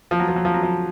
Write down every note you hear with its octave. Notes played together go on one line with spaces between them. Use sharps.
F3
F#3
F3
F#3
F3
F#3
F3